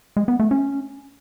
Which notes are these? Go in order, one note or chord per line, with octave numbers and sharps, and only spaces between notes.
G#3
B3
A3
C#4